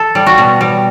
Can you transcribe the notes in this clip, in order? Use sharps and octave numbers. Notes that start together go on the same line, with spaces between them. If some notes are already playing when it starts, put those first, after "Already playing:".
Already playing: A4
G3
F#4
B2
G3